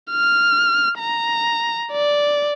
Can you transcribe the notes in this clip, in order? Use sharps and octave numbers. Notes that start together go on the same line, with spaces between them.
F6
A#5
D5